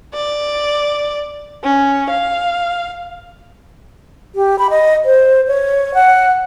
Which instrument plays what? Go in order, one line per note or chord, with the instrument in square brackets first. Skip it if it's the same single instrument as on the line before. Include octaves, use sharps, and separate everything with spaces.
[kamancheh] D5
C#4
F5
[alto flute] G4
B5
D#5
C5
C#5
F#5